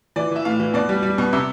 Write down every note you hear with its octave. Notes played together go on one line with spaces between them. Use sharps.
E3 D5
E3 E5
A2 F5
E3
B2 D5
G3
G3
B2
C3